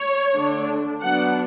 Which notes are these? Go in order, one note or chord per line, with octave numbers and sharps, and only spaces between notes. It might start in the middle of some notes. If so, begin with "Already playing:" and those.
Already playing: C#5
D3 A3 D4
F#3 B3 D4 F#5